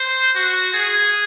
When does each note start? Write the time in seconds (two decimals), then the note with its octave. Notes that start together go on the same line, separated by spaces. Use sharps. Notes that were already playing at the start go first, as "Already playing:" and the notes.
Already playing: C5
0.36 F#4
0.74 G#4